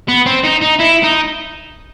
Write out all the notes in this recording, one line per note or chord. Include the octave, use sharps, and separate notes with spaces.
B3
C4
D#4
D#4
E4
D#4